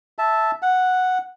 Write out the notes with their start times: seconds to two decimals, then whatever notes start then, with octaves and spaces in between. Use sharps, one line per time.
0.19 E5 A5
0.62 F#5